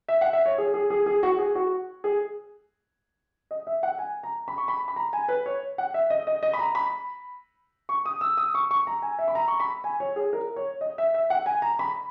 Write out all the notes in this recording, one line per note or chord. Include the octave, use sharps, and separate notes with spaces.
E5
F#5
E5
C#5
G#4
G#4
G#4
G#4
F#4
G#4
F#4
G#4
D#5
E5
F#5
G#5
A#5
B5
C#6
B5
B5
A#5
G#5
B4
C#5
F#5
E5
D#5
D#5
D#5
B5
A#5
B5
C#6
D#6
E6
D#6
C#6
C#6
A#5
G#5
E5
B5
A#5
C#6
B5
G#5
C#5
G#4
A#4
C#5
D#5
E5
E5
F#5
G#5
A#5
B5